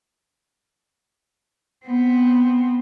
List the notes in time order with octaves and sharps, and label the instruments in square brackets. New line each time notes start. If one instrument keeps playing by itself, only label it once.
[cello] B3 C4